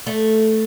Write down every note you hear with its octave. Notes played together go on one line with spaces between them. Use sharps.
A3